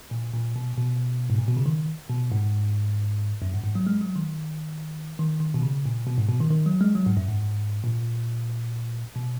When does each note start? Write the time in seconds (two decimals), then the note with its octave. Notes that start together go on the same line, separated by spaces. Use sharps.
0.11 A#2
0.34 A#2
0.56 B2
0.73 A#2
0.77 B2
1.30 G#2
1.38 A#2
1.48 B2
1.57 C#3
1.66 D#3
2.10 B2
2.32 G#2
3.42 F#2
3.54 G#2
3.64 G#2
3.75 F#3
3.87 G#3
4.01 F#3
4.16 D#3
5.19 D#3
5.41 D#3
5.54 B2
5.63 C#3
5.86 A#2
6.07 B2
6.18 G#2
6.29 B2
6.40 D#3
6.51 D#3
6.66 F#3
6.81 G#3
6.95 F#3
7.06 G#2
7.17 F#2
7.29 G#2
7.83 A#2
9.16 B2